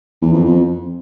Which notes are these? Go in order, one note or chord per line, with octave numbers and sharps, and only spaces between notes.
E2
F2
F2